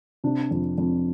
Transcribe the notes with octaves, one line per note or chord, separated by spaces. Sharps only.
C3 D4
F2
F2